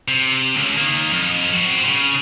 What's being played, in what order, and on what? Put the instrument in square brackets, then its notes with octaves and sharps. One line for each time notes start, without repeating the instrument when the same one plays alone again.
[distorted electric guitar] C3
C#2
D#3 A#3
F2
C4 F#4
C#3